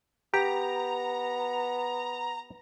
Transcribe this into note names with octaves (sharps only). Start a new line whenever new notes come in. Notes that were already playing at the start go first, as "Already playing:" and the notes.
B3 G4 A#5